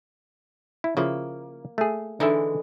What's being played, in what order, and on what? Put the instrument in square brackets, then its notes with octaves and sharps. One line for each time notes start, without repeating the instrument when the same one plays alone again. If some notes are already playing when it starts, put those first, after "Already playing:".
[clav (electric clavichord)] E4
[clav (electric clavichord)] C#3 F3 E4 [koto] A#3
[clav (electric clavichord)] A3 G#4
[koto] D3 E3 G#3 [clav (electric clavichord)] D#4 E5